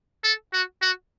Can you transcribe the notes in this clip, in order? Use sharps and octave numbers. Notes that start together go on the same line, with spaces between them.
A4
F#4
F#4